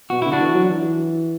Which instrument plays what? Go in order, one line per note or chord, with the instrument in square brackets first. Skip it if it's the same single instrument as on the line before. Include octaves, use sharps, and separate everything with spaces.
[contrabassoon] B2 [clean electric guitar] F#4
[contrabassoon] D3 [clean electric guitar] E4
[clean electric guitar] D4 F#4
[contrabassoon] E3
F#3
E3